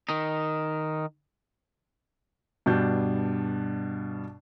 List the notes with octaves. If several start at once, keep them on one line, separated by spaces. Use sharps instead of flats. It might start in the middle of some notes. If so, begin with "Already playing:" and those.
D#3 D#4
G2 B2 D4 G6